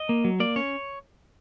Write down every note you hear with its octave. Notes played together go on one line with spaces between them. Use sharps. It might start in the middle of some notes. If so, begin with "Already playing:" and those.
Already playing: D#5
A#3
F#3
A#3 D5
C#4 C#5